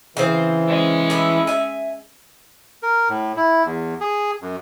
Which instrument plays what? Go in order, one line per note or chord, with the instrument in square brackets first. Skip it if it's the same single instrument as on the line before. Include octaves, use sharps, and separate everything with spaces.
[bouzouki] C#3 C4 C5 [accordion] E3
[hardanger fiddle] G#3 C#4
[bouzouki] A2 E4
E5 G#5
[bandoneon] A#4
A2
E4
E2
G#4
F#2